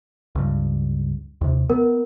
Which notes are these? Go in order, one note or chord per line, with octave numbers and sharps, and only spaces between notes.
C#2 G2
D#2 C3
B3 A#4